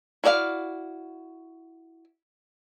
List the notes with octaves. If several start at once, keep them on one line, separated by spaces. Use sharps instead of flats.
E4 F#4 D5 D#5 F5